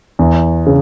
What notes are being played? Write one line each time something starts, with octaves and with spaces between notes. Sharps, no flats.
E2
C#3